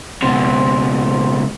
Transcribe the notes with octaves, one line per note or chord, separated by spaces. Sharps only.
C#2 B2 C5 C6